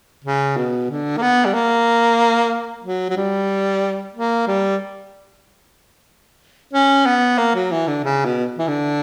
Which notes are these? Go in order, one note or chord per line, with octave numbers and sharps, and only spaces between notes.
C#3
B2
D3
A#3
B3
G3
A#3
F#3
F#3
G3
A#3
G3
C#4
B3
A#3
F#3
E3
D3
C#3
B2
E3
D3